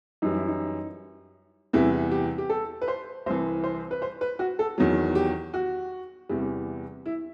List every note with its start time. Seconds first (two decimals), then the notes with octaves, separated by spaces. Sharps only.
0.22 F#2 E3 G3 D#4
0.34 E4
0.48 D#4
1.73 E2 C3 E3 G3 E4
2.11 G4
2.38 G4
2.50 A4
2.82 B4
2.88 C5
3.26 C2 C3 E3 C5
3.64 C5
3.91 B4
4.02 C5
4.21 B4
4.39 F#4
4.59 A4
4.78 E2 D#3 F#3
5.15 G4
5.54 F#4
6.29 E2 C3 E3 G3
7.06 E4